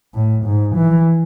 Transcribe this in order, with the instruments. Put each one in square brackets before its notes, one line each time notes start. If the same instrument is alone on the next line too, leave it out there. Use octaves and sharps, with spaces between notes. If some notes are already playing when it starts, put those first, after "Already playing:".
[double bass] A2
G#2
E3